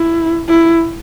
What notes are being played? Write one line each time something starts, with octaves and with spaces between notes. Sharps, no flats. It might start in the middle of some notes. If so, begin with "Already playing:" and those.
Already playing: E4
E4